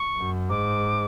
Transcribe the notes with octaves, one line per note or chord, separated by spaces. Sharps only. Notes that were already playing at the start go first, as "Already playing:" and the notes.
Already playing: C#6
F#2
G#2 D6